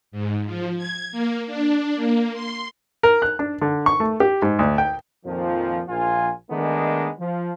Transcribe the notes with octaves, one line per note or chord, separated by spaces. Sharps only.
G#2
F3
G#6
A#3
D4
A#3
C6
A#4
F#6
D4
D3
C#6
A3
G4
G#2
D2
G5
F2 A#2 D#3 F3
A#1 F4 G#5
D#3 G#3 A3 B3 D4 D#4
F3